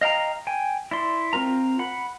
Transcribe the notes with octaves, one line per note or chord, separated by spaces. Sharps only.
D#5 F5 G5 A#5
G5 G#5
E4 D5 C6
C4 F4 A#4 A#5
F#5 B5